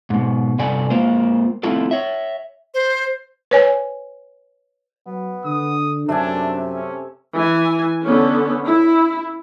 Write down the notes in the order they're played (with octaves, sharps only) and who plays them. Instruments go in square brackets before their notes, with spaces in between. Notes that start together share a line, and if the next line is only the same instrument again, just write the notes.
[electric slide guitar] G#2 B2
G2 C3 A4 D5 G#5
G#3 A#3 F4 A#4 C5
A3 C4 E4 F4 A4
C#5 E5
[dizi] C5
[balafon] B4 C#5 G#5
[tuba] F#3 [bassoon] B3
[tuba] D3 [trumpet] D#6
[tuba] F#2 [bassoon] C3 [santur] A3 E5 G#5 [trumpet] D4
[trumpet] C#4
[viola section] E3 G#5
D3 B3 C#4
E4